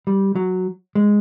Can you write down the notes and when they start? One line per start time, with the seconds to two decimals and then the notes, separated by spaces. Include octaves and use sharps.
0.07 G3
0.36 F#3
0.95 G#3